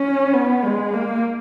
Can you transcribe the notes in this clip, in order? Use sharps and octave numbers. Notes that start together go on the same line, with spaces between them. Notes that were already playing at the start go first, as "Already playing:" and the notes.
Already playing: C#4
B3
G#3
A#3